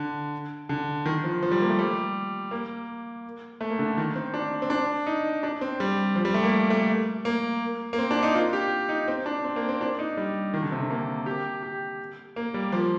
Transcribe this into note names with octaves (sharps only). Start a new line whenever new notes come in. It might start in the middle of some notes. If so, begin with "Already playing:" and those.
Already playing: D3
D3
D#3
F3
F3
G3
A#3
A3
G3
A#3
A3
A#3
D3
D#3
C4
D4
C4
D4
D#4
D4
C4
G3
F3
G3
A3
A#3
A3
A#3
A#3
C4
D4
D#4
F4
G4
D#4
C4
D4
C4
A#3
C4
D4
D#4
G3
D#3
D3
C3
D3
A#3
G4
G4
A#3
G3
F3